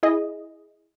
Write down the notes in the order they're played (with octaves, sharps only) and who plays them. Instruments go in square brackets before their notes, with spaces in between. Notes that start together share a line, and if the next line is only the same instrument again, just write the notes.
[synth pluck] E4 G#4 D#5